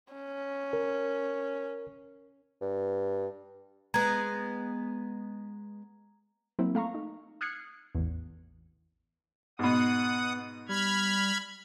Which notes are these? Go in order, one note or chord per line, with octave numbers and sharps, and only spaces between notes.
C#4
A#4
G2
G#3 B3 A#5 G#6
F#3 A#3 C4 E4
A3 F5 A#5 C#6
D#4
D#6 F6 F#6 G#6 C7 C#7
A1 E2
G#2 B2 B3 F#5 D#6
G3 B5 F6 G#6